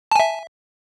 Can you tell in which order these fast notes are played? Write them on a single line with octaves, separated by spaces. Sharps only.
A5 G#5 E5